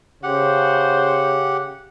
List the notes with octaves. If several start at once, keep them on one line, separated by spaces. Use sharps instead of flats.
C#3 G4 C5 F#5